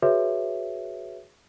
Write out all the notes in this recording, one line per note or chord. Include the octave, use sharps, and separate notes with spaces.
F#4 G#4 B4 C#5 E5